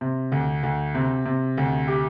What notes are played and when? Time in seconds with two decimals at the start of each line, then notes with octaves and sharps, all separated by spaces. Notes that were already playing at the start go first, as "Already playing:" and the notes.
0.01 C3
0.32 D2
0.63 D2
0.95 C3
1.25 C3
1.57 D2
1.88 G4